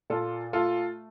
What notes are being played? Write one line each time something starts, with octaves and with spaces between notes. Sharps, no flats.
A#2 F4 A4
A3 F4 A4